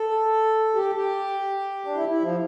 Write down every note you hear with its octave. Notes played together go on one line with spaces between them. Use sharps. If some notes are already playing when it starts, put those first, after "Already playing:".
Already playing: A4
G4
G4
D4
E4
E4
F3